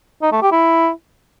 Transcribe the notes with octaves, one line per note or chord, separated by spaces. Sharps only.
D#4
A3
G4
E4